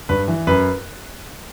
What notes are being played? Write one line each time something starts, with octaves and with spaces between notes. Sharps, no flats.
G2 B4
E3
F#2 B4